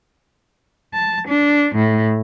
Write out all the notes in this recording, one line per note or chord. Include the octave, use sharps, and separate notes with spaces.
A5
D4
A2